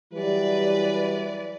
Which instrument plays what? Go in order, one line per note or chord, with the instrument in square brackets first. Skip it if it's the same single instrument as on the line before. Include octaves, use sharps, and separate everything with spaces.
[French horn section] E3 F#3 G3 [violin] B4 D5